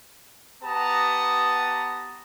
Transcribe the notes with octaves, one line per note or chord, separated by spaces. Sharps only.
B3 G4 B4 A5 A#5 D#6